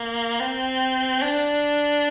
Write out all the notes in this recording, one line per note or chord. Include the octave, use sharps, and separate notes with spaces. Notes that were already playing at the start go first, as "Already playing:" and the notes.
Already playing: A#3
C4
D4